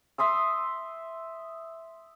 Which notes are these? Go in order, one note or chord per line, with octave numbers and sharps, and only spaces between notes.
E5 C6 D#6 E6